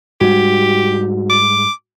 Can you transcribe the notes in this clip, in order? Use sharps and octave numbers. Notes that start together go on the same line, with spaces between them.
G#2 G3 F#4 G4
D6